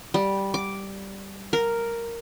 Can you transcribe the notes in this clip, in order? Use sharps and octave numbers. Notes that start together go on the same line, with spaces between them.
G3
D6
A#4